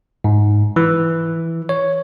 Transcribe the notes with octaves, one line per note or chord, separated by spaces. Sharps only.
G#2
E3
C#5